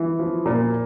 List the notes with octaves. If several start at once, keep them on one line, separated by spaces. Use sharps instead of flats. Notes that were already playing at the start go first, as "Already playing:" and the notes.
Already playing: E3
F3
A#2